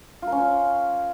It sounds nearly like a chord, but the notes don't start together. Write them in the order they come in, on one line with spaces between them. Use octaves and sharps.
F4 A#4 C#4 C5